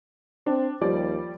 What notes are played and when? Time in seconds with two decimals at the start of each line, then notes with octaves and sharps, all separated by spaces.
0.46 C4 D4
0.81 D#2 F3 G3 D5